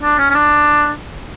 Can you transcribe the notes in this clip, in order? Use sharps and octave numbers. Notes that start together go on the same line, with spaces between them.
D4
C#4
C#4
D4